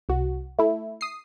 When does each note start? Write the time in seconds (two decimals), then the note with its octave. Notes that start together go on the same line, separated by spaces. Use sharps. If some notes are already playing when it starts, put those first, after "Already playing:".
0.09 C2 F#4
0.59 A3 E4
1.01 D#6 C7